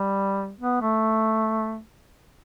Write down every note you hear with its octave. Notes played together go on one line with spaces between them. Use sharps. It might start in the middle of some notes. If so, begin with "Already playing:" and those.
Already playing: G3
B3
A3